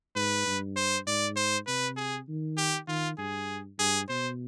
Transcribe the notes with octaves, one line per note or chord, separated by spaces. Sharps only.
G#2 B4
G2
C5
G#2 D5
C5
C3 B4
G#4
D#3
G4
D#3 F4
G2 G#4
G2 G#4
B2 C5